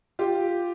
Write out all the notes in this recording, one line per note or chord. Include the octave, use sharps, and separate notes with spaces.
F4 G4